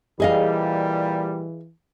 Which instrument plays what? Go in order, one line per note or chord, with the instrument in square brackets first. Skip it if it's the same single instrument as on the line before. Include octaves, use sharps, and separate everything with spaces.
[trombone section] A#2 G3 [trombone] E3 [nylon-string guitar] G#4 D#5 F5